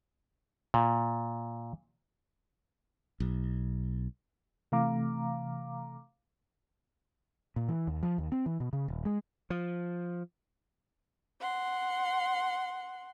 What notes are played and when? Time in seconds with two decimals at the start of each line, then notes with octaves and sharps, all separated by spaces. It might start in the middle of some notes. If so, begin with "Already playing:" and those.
0.74 A#2
3.20 B1
4.72 C3 E3 A3 F5 A#5 D6
7.56 A#2
7.69 E3
7.87 D#2
8.03 F3
8.18 D#2
8.32 C4
8.46 E3
8.60 B2
8.73 C#3
8.88 D#1
9.05 G#3
9.50 F3
11.41 F#5 C6